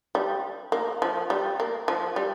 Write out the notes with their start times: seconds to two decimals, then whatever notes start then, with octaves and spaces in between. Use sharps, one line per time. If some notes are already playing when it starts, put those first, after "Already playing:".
0.15 G3
0.72 A#3
1.02 F3
1.30 G3
1.60 A#3
1.88 F3
2.16 G3